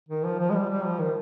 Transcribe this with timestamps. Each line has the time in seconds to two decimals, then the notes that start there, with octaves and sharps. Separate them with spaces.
0.09 D#3
0.25 F3
0.39 F3
0.50 G#3
0.55 G3
0.69 G3
0.85 F3
0.99 D#3